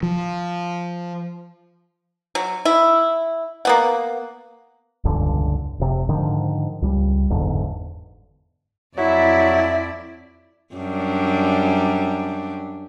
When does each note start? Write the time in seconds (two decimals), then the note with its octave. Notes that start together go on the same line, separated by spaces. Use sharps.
0.03 F3
2.35 F#3
2.65 E4
3.65 A#3 B3 F#5
5.05 E1 C#2 G2 D3
5.80 F1 C3
6.09 G#2 D3 D#3 F3
6.82 C#2 G3
7.30 F#1 E2 G#2 D3
8.98 F2 F#3 E4 D5 E5
10.75 F#2 G3 D4